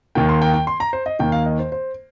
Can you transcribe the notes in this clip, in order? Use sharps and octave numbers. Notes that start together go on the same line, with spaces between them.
D#2 D#3 A#3 G5
C6
G5
G5
C6
A#5
C5
D#5
D#2 D#3 A#3 G5
F5
D#5
C5
C5